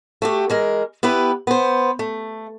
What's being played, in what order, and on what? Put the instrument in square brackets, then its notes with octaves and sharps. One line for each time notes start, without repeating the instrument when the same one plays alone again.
[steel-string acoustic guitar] A3 F#4 G4
E3 G#3 A#4
B3 E4 G4 B4
B3 C5
A3